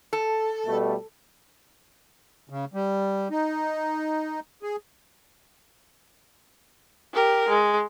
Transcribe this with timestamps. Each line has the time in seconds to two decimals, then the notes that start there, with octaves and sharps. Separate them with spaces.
0.13 A4
0.67 B2 G3 A3
2.50 C#3
2.74 G3
3.30 D#4
4.63 G#4
7.14 G4 A#4
7.49 G#3